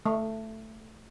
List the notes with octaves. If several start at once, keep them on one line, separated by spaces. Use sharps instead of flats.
A3